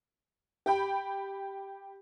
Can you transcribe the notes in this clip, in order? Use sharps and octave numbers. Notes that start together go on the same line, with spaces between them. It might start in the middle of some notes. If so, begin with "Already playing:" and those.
G4 G5 B5